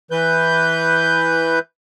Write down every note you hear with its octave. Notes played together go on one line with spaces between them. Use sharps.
E3 B4 G6